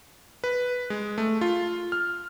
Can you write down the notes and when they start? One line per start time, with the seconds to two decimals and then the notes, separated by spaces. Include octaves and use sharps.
0.44 B4
0.90 G#3
1.18 A3
1.41 F4
1.92 F6